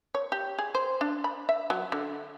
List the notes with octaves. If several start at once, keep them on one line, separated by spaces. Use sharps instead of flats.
C#5
G4
G#4
C5
D4
B5
E5
F#3
D3